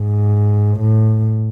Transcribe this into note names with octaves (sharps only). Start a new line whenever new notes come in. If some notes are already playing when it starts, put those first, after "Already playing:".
Already playing: G#2
A2